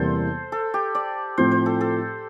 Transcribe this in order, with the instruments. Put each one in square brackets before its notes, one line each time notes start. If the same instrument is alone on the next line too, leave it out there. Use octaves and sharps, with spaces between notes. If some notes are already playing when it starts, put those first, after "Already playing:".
Already playing: [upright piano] E2 C3 E3 G3 A#3 [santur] A4 C5
[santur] A4
G4
D5
[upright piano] A2 F3 C4 [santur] C5
[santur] C5
A4
A4